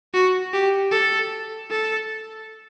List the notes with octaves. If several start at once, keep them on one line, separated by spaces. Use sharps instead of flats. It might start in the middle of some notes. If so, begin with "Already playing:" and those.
F#4
G4
A4
A4